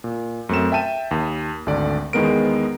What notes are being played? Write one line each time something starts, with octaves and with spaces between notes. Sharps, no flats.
A#2
F#2 A3 C4 E7
E5 G5 A5 D#7 E7
D#2
G#1 D2 D3 D5
E2 D#3 G#3 B3 A#4 D7